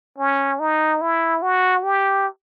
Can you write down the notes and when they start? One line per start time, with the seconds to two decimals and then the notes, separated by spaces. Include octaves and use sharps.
0.18 C#4
0.60 D#4
1.01 E4
1.42 F#4
1.83 G4